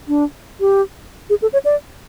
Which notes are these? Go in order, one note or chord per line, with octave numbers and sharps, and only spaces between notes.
D4
G4
G#4
A4
C#5
D5